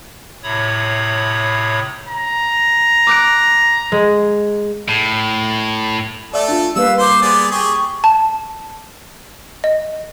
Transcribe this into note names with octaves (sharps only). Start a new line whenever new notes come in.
A2 C3 C#5 B5 D#6
A#5
D6 F#6 D7
G#3
A2
A3 A4 D5 E5
D4 F4
G3 A#3 B4 F5 E6
C5 C6 D6
B3 G#4 D5
G4 G#4 C#6
A5
D#5